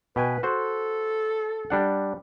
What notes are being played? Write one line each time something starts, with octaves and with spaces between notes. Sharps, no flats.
B2 B4 G5 G#5
F#4 A4 C5
G3 D4 F#5